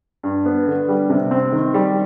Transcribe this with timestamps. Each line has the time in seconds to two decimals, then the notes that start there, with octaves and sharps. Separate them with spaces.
0.23 G2
0.45 B3
0.67 D3
0.88 G3
1.10 C3
1.31 C4
1.52 D#3
1.74 G3